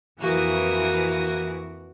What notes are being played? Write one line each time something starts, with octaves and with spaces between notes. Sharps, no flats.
F2 E3 A#3 F#4 D#6